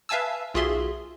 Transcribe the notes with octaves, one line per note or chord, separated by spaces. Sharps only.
B4 E5 F5 G#5 A5 E6
B1 F4 F#4 G#4 E5 C6